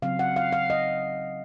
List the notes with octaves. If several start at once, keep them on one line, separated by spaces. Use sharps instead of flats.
C#3 F#3 C4 F5
F#5
F5
F5
D#5